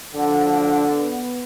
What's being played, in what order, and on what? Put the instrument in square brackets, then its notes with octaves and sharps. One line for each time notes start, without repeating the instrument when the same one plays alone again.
[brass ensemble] D2 F3 F#5 [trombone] D3
[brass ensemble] B3